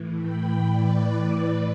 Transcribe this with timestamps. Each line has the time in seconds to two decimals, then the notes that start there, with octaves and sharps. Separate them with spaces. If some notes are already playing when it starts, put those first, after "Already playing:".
Already playing: A2 E3
0.17 G5 B5
0.63 B4 D5